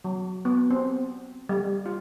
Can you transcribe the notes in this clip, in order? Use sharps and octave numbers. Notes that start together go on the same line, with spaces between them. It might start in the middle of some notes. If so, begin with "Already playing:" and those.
F#3
B3
C4
G3
F4